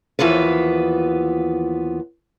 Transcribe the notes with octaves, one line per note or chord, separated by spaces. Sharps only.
D#2 E3 F3 B3 B4